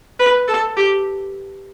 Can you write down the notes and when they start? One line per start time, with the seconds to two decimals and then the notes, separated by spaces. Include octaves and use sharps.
0.19 B4
0.48 A4
0.77 G4